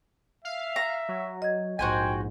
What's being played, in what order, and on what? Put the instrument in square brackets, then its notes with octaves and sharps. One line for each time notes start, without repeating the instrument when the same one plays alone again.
[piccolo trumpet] E5 [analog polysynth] F5
[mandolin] A#5
[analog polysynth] F#3
[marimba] D#5 G#6
[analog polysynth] A#1 G#2 [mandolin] F#4 C5 G#5 [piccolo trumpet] G5